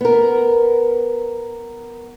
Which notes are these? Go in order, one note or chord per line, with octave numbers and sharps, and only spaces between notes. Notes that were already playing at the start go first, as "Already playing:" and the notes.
B3 A#4